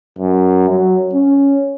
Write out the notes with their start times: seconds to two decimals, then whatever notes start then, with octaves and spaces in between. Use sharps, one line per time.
0.18 F#2
0.69 F#3
1.13 C#4